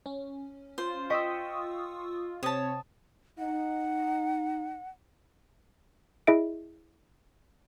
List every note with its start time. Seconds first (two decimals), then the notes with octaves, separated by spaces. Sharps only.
0.06 C#4
0.78 F4 C5
1.10 D#5 G5 C#6 D#6 E6 B6
2.43 C3 C4 C#5 A5 D#6
3.39 D#4 F#5
6.27 E4 G#4 D#5 E5 D7